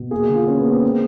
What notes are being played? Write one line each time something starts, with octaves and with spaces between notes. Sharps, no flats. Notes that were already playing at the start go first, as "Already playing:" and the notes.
Already playing: B2
A#3 G#4
F#4
D3
F4
A#3 C#4
B3
A#3
C4
G#3 C4